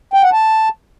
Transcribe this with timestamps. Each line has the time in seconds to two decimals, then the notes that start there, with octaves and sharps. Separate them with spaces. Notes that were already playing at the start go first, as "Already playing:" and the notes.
0.14 G5
0.23 F#5
0.32 A5